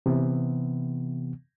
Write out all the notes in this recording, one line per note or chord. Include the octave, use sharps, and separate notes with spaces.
C3 E3 B3